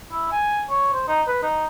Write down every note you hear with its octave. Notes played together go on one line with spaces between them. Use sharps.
E4
G#5
C#5
C5
D#4
B4
D#4